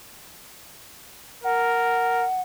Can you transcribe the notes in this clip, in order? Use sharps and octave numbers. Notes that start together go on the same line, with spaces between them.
A#4 F#5